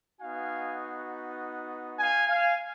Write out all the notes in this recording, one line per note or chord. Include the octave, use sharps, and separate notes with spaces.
B3 D#4 F#4 F5 G#5
F5 G#5
F5 G#5